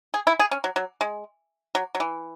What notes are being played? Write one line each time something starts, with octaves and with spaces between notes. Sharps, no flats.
G#4
E4
G#4
C#4
F#3
F#3
G#3
F#3
F#3
E3